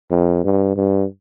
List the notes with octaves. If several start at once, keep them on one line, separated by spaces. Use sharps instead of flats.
F2
G2
G2